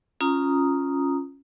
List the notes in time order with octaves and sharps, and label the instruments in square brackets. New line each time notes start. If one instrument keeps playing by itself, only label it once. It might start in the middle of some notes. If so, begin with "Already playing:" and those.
[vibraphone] C#4 F4 A#5 D#6